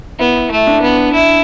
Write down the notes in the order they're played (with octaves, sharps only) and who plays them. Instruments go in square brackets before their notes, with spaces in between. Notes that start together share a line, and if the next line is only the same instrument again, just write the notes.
[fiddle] B3 [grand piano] E4
[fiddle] A3
[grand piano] D4
[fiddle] B3
E4